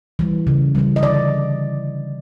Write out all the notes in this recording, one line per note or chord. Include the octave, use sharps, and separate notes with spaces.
E3 G3
C#3
E3 G3
D#5
D3 D5